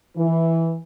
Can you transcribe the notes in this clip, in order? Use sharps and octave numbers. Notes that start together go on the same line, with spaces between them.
E3